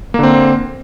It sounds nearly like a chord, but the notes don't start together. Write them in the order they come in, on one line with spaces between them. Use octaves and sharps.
A#3 D3 C4